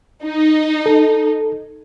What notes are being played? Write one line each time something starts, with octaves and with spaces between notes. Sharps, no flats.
D#4
A4